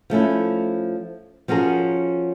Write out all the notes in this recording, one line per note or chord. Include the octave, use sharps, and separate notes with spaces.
F3 A3 C#4 E4
F3 C#4 F#4 G#4 A#4